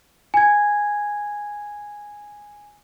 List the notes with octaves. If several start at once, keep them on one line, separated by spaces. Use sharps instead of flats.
G#5 G#6